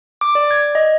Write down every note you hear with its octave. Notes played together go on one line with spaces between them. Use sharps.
D6
D5
G#6
D#5